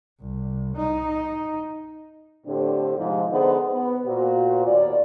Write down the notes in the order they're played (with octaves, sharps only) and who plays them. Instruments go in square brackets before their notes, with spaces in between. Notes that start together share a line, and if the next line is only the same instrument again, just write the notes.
[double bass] C2
D#4
[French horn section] A2 D3 C4 D4 G4 C5
G#2 C3 F3
D3 B3 D#4 G#4 C5
B3
A#2 F#4 C5
D#2 B2 F4 C#5 D5